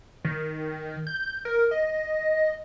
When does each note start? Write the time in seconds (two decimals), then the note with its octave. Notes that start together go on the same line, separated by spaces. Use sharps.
0.25 D#3
1.07 G6
1.45 A#4
1.71 D#5